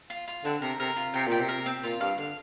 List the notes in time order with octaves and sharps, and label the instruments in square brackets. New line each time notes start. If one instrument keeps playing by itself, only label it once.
[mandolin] F4
F4
[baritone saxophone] D3 [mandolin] C4
[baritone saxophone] C3 [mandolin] A#4
[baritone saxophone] C3 [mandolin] A#4
[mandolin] F4
[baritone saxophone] C3 [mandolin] G5
[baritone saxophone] A#2 [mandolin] G5
[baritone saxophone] C3
[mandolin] A#4
C4
[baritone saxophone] A#2 [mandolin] F4
[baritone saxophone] G2 [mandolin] F5
[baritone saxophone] D3 [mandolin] F5